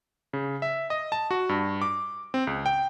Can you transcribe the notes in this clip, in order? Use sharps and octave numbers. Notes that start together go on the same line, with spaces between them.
C#3
E5
D#5
A5
F#4
G2
D6
C4
C#2
G5